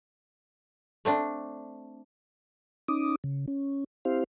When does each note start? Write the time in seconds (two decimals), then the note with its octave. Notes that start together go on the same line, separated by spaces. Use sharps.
1.05 A3 C4 D4
2.88 C#4 D#4 D6 D#6
3.24 C#3
3.48 C#4
4.05 C4 E4 G4 C5 F5